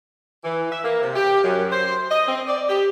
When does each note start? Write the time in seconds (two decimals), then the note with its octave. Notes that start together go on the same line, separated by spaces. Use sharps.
0.44 E3
0.71 E5
0.84 A#3
1.02 C3
1.16 G4
1.43 F#2
1.71 C5
2.11 D#5
2.28 C4
2.47 D5
2.69 G4